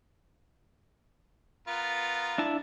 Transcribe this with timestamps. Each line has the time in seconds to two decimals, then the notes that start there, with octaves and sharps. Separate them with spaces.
1.68 B3 F4 A#4
2.38 D4 E4 A5